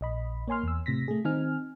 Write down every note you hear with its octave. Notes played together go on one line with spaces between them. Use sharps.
A#1 D#5 B5
A#3 C#5 G#5 C6 F6
E2 E6
A2 C3 A#6 B6
A3 G#4
D#3 C4 D#4 G#5 F6